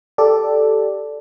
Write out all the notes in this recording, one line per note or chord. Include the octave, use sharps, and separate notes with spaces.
G4 A4 D5